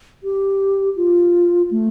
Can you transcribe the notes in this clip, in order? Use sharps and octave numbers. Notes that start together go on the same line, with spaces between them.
G4
F4
A3